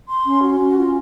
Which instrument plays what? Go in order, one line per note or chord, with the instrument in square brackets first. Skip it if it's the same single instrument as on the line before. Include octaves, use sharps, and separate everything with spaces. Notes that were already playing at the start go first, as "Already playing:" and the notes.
[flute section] C6
C#4
F#4
C#4
F4